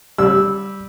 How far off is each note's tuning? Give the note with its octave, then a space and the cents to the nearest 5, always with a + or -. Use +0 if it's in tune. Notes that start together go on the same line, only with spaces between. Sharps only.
G3 +0 E6 -10